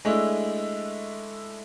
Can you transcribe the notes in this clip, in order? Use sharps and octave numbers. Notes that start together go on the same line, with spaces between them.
G#3 A3 D4 E4